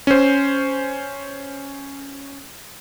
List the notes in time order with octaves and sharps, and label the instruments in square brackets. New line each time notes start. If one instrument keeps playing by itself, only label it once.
[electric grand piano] C#4 C5